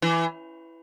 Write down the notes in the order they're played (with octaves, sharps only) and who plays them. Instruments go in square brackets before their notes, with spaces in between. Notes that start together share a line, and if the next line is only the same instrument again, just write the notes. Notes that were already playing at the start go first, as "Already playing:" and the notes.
[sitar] E3